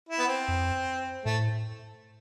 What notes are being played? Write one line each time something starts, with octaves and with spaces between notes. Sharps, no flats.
E4
B3
C4
F2
A2 A3